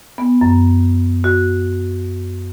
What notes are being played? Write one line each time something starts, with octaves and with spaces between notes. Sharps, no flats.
B3
F#2
F#4